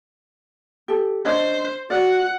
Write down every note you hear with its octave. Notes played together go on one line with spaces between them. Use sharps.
G4 A4
D4 C5 C#5 D#5
F#4 D5 F#5